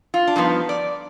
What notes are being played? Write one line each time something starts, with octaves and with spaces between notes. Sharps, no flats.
F4
D4
G2 F3 B3 D#4
D5